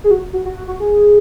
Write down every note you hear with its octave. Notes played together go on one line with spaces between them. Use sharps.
G#4
F#4
F#4
F#4
F#4
F#4
G#4